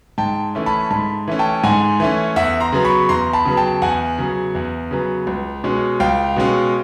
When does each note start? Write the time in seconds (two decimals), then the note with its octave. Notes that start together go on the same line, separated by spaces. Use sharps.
0.18 G#2 G5 A5
0.55 E3 A3 C#4
0.66 A5 B5
0.90 G#2 A5 B5
1.28 E3 A3 C#4
1.39 G5 A5
1.64 G#2 F#5 G#5
2.00 E3 A3 C#4
2.36 E2 E5 F#5
2.60 A#5 C6
2.72 C#3 F#3 B3
2.85 B5 C#6
3.09 E2 A#5 C6
3.33 A5 B5
3.45 C#3 F#3 B3
3.57 G5 A5
3.82 E2 F#5 G#5
4.18 C#3 F#3 B3
4.55 E2
4.91 C#3 F#3 B3
5.27 C#2
5.64 B2 G#3 C#4
6.00 C#2 F5 G5
6.36 B2 G#3 C#4